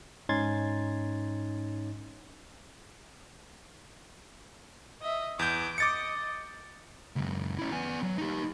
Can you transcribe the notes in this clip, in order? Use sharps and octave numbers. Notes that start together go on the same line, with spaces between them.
G#2 C#4 D#4 C6 G#6 A6
D#5 E5
E2 D6 G6
D#5 D6 A6 C#7
C#2 F#2
C#4 E4
B3 G#5
F#3
D#4 G4